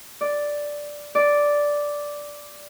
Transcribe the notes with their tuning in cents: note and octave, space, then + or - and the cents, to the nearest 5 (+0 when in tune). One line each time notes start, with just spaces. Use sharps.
D5 +0
D5 -5